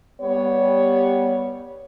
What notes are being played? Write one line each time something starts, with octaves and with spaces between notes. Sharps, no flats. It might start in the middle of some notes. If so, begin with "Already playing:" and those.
G3 B3 G4 C#5